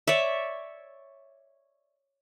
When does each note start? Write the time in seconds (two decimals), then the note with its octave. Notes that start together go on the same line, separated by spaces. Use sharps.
0.07 C#5 D5 E5